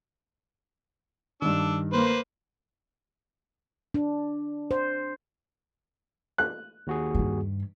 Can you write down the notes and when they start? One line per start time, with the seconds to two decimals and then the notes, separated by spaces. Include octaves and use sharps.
1.42 G2 D#3 D4 E6
1.93 A#3 B4 C5
3.94 D4
4.71 C5
6.38 F#6
6.87 D#2 F#4 G#4
7.14 G2 D#3